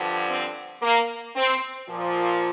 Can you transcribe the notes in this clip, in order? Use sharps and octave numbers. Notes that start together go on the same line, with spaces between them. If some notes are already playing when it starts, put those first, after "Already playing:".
Already playing: G2 D3 F3
C4
A#3
C4
A#2 F3